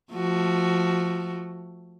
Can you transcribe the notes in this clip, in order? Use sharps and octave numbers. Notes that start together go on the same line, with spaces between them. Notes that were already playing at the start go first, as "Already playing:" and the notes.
F3 A3 F#4